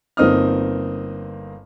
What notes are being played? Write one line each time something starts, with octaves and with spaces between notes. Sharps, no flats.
G1 A#3 C4 D#4 D#6 F6